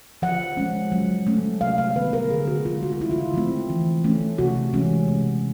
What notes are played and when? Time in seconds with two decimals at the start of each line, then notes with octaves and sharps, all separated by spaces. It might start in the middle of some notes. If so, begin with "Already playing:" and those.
0.22 F3 F#5
0.57 G#3 C#4
0.92 F#3
1.27 A3 C#4
1.61 C3 F5
1.78 F5
1.96 D#3 G3 B3 B4
2.13 A#4
2.30 D3 G#4
2.48 F#4
2.65 F3 G#3 F4
2.83 F#4
2.92 F4
3.00 C#3 E4
3.11 F4
3.34 F3 A3 C4
3.70 E3
4.04 A3 C#4
4.38 C3 F#4
4.73 E3 G#3 C#4
5.08 C3